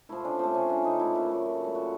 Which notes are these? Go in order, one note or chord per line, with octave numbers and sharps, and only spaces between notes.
F3 A3 E4
C#3 D4
F3 A3 C4
C#3 C#4
F3 A3 D4
C#3 D#4
F3 A3 E4
A#2 E4
F#3 A3
A#2
F#3 A3
A#2 F#4